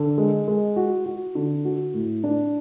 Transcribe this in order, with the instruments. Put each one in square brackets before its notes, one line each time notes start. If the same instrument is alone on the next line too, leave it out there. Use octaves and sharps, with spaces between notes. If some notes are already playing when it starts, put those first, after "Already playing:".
Already playing: [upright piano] D3
G#3
G#3
F#4
F#4
D3
F#4
A2
D4